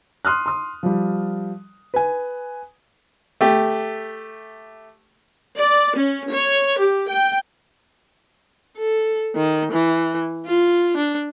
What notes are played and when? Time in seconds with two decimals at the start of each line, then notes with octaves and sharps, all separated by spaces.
0.25 C6 D#6 F6 F#6
0.46 C6 D#6
0.83 F3 G3
1.94 B4 G#5
3.41 A3 G4
5.57 D5
5.97 C#4
6.32 C#5
6.80 G4
7.09 G5
8.78 A4
9.35 D#3
9.72 E3
10.46 F4
10.97 D4